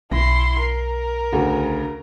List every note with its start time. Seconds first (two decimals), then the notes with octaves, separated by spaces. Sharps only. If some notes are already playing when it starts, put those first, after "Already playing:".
0.12 B1 E4 C6 A#6
0.59 A#4
1.32 D2 C#3 F#4